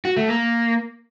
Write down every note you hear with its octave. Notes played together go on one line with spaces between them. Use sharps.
F#4
A3
A#3